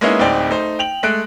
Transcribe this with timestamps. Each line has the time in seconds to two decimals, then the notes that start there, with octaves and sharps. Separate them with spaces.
0.01 G#3 A#3 B3 C#4 D#4 E4
0.19 D1 D2 C4 D#4 D5 G5
0.50 A3 D#4 C5
0.79 G5 F7 F#7
1.03 G#3 A3 F#6 D7